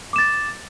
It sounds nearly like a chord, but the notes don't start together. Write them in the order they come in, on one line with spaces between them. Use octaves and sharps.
D6 E7 A6